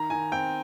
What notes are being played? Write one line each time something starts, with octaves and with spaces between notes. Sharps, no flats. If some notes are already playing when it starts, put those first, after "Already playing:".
Already playing: D#3 A#5
D#3 G#5
C4 G5